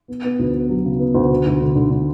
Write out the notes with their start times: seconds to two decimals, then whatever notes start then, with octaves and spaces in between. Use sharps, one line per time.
0.08 B3
0.24 B3
0.39 D2
0.54 B3
0.69 F#3
0.85 C#3
0.99 B3
1.14 D2
1.30 D3
1.46 D2
1.61 D3
1.75 D3
1.91 D3